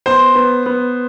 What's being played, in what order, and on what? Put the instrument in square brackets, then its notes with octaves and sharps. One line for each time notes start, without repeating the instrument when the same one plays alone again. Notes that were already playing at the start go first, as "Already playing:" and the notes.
[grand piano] B3 C5 C6
B3
B3